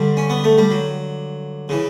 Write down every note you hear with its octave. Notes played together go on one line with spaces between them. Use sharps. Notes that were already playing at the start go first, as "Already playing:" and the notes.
Already playing: G2 D3 G3
C#4
B3
A3
G3
F#3
C#3 E3